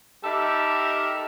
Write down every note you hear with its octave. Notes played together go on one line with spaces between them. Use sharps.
G3 D#4 G4 A4 A#4 E5